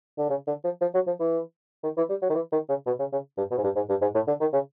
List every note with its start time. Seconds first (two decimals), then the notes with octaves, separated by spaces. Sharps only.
0.18 D3
0.30 C#3
0.47 D3
0.64 F3
0.81 F3
0.94 F#3
1.07 F3
1.20 E3
1.83 D#3
1.97 E3
2.09 G3
2.22 F#3
2.30 D#3
2.35 E3
2.52 D#3
2.69 C#3
2.86 B2
2.99 C#3
3.12 C#3
3.37 G2
3.51 B2
3.58 G#2
3.64 G2
3.76 G#2
3.89 G2
4.02 G#2
4.15 A2
4.28 D3
4.41 D#3
4.53 C#3